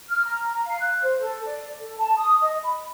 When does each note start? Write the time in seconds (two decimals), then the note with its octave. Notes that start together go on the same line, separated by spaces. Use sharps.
0.08 F6
0.25 A#5
0.63 F5
0.80 F#6
1.02 C5
1.20 A4
1.45 D5
1.79 A4
1.97 A5
2.18 D#6
2.41 D#5
2.64 B5